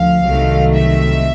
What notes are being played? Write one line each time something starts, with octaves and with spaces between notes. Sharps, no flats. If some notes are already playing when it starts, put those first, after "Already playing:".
Already playing: D2 F3 F5
C2 C3 D#3 F#3 A3
E5